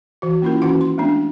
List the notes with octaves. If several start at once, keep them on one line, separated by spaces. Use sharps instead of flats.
E3 F#4
A#3 C#4 E4 F4 A#4
D#3 E3 C#4 F#4 F#5 C6
C6
G#3 A3 B3 D4